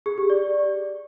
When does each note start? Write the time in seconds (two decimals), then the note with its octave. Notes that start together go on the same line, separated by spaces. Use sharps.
0.06 G#4
0.18 G4
0.30 D5